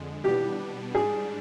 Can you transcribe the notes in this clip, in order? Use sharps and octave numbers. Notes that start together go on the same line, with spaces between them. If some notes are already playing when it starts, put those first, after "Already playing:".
Already playing: F2 D3 G#3
B2 G3 B3 D4 G4
G#2 G3 D4 G#4